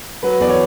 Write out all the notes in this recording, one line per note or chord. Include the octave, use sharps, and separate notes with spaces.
F#3 B4
E2 D5
C#5